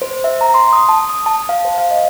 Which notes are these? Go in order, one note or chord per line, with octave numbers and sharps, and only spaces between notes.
C5
E5
A#5
C6
D#6
A5
D#6
A5
F5
C5
F5
D#5